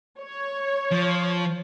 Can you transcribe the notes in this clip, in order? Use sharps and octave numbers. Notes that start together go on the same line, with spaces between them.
C#5
F3